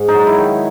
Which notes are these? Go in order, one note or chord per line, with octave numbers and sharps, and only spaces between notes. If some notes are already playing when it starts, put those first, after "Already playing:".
Already playing: G#2
D#4
F#3
E4
D#3